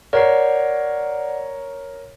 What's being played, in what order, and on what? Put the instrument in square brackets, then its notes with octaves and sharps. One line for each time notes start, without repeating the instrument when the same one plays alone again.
[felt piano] A#4 C#5 [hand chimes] D5 F#5 C7